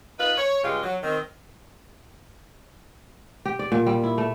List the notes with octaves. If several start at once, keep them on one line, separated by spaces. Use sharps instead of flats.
D#4 F4 B4
C#5
G2 C#3 G#3 F4 G4
F#3
D#3 C4
G4
D5
A#2
G3
E4
A3